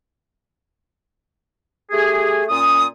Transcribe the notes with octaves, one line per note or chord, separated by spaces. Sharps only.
A3 G4 G#4
A#2 C#4 D#6